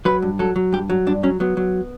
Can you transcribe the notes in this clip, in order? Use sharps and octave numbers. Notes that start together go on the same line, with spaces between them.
F#3 B4
G2
F#3 A4
F#3
G2 G4
F#3
G2 D4
F#3 C#4
F#3 B3
F#3